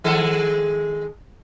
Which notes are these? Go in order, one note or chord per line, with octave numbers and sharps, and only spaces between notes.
D#3 G#3 A4